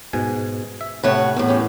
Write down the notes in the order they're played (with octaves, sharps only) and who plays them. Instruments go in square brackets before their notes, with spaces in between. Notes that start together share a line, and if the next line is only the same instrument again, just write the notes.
[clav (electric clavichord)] G#2 B2 G#5
E5
[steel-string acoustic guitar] A2 C#5 F#5 [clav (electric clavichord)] C3 A3 B4
[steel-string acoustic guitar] E2 A2
[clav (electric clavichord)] B3 C#4 G4